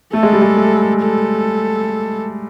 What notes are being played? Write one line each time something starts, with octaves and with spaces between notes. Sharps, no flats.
A3 A4
G#3
G3
G#3
A3
A4